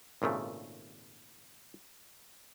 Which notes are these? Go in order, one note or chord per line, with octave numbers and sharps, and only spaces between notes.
G#1 A#2 C#3 A3